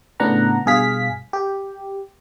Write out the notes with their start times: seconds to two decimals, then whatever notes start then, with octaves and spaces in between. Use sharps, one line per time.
0.20 A2 C#3 B3 D4 F#5 A#5
0.66 G2 B2 G#4 F5 B6
1.33 G4